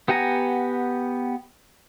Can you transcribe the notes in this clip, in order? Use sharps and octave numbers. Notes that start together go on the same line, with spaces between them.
B3 G4 F#5 G#5 A#5